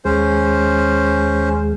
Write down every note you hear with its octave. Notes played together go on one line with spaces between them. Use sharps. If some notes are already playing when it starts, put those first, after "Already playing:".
D#2 G#3 C#4 C5